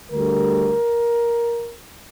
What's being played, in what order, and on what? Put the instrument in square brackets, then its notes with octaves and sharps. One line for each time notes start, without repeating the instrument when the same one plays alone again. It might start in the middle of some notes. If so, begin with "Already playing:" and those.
[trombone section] D2 D3 G3 A#4